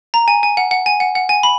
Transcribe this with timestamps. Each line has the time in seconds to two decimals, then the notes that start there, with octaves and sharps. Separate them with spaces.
0.14 A#5
0.28 G#5
0.43 G#5
0.57 F#5
0.71 F#5
0.86 G#5
1.00 F#5
1.15 F#5
1.29 G#5
1.43 B5